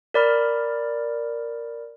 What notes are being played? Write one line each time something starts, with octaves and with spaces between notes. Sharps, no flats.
A#4 D5 B5 F6